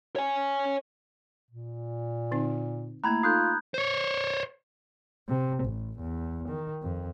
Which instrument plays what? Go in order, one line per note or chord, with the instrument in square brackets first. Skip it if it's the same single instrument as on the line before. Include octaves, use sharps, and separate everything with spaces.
[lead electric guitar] C#5 G#5
[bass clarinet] A#2
[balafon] D3 C4 D#4
[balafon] A3 A#3 [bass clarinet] E4 [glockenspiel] A#5 B5 G#6
[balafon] D#4 A4 [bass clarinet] F4 [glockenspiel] D#6 F#6 G6
[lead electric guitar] C5 C#5
[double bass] C3
A1
E2
D#3
F2